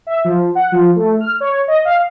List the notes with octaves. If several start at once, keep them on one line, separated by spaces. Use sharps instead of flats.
E5
F3
F#5
F3
A3
F6
C#5
D#5
F5